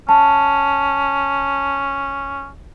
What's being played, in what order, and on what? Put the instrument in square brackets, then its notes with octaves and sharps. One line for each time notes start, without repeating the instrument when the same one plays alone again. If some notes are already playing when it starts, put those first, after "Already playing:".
[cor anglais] C#4 [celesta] A5